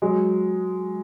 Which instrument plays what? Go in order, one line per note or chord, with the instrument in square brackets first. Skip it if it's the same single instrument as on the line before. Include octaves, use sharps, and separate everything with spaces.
[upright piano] F#3 G#3